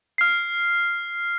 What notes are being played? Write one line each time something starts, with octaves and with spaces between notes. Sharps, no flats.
F6 C7